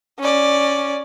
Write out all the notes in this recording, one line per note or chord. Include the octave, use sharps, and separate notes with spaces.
C#4 D5